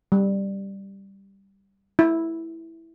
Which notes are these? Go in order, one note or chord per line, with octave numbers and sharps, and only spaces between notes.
G3
E4